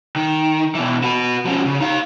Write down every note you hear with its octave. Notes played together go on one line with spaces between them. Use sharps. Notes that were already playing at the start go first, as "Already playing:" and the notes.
D#3
B2 E3
F#4 B4
F3 C#4
C#3
D#4 F5